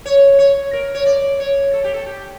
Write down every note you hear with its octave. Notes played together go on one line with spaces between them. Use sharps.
C#5
C#5
A#4
C#5
D5
C#5
A4
G4
A4
G4